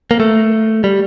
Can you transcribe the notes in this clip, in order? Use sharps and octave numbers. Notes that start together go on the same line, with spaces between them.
A#3
A3
G3